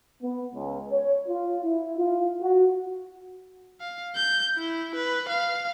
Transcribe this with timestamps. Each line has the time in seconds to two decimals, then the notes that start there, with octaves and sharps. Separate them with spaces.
0.21 B3
0.54 C#2
0.91 C#5
1.27 F4
1.63 E4
1.97 F4
2.40 F#4
3.81 F5
4.16 G6
4.57 E4
4.95 B4
5.28 F5